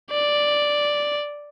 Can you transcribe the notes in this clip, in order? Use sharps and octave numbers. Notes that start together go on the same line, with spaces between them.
D5